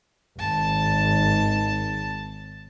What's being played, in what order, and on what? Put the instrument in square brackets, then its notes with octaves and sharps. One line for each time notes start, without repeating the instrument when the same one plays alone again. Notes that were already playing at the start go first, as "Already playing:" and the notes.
[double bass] G#1 [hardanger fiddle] A5